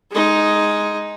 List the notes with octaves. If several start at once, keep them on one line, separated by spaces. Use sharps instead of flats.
G#3 D#4